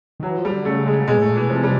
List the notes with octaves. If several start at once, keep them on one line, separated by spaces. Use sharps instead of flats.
D#3
E3 F#3
F3
G3
D3
C#3 A3
G#3
B2 G#3
A2 A3
A#2
B2 E3
C3 F3
G3